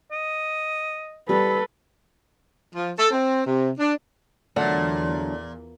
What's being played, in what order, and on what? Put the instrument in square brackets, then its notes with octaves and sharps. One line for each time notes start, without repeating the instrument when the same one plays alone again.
[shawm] D#5
[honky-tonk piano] G3 [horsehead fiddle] A4 B4
[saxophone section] F3
A4
C4
C3
D4
[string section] E2 [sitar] A#2 [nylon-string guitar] D3 F#3 [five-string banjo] A3 D4 F#5